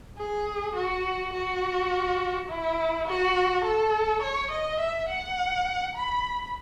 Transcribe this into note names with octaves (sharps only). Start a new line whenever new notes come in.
G#4
F#4
F#4
E4
F#4
A4
C#5
D#5
E5
F#5
B5